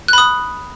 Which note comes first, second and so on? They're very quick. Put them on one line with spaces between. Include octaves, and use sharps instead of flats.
F#6 B5 D#6